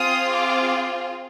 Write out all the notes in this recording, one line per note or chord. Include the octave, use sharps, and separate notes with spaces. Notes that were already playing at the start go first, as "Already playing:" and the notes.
Already playing: C4 F4 G#4 D#6
D6